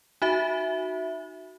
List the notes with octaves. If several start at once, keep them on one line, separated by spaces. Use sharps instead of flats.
D#4 F#4 E5